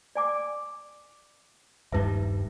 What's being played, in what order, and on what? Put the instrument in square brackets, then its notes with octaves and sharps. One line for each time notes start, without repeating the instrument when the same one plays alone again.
[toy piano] D5 G#5 D6
[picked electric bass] D#1 G2 G3 [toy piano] D#4 B4 E5